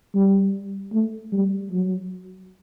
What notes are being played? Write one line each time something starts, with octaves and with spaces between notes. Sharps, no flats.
G3
A3
G3
F#3